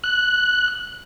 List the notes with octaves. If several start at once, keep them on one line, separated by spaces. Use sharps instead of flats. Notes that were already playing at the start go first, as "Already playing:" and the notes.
F#6